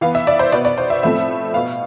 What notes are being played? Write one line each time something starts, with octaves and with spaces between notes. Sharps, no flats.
E3 B3 F5
E5
D5
C5
B2 B3 D5
D5
C5
E5
A2 F3 A3 C4 E5
B2 B3 F5